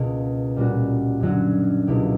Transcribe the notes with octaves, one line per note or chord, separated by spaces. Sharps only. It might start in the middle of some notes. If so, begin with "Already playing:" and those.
Already playing: C#2 B2 A#3
A#2 G3 C#4 F#4
F#2 D3 F#3 C#4 F#4
C#2 B2 A#3 E4 G4